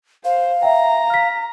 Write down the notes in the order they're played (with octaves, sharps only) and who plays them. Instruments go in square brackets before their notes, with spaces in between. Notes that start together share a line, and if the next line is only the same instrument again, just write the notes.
[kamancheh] C5 [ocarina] F5
[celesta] E5 G5 [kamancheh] A#5
[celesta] F6 B6